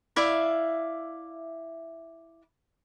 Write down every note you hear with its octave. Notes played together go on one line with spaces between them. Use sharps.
E4 D5 E5 F5